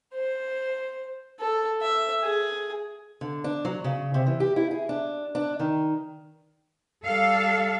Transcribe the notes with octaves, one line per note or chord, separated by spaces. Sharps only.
C5
A4
E5
G#4
D3
D4
F#3
C#3
C3
E3
G4
E4
G#4
D4
D4
D#3
G3 A4 F5